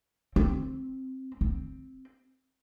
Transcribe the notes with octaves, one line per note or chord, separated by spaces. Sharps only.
C4
C4